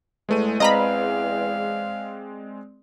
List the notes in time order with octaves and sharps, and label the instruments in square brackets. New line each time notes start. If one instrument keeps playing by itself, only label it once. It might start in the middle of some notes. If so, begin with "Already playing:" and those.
[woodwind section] E2 [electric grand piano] G#3 A3 D#7
[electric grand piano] G#3 C4 D5 [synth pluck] D#5 A#5 B5 [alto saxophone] F5